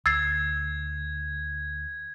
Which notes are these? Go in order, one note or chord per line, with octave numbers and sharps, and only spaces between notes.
D2 E6 G#6 A6 C7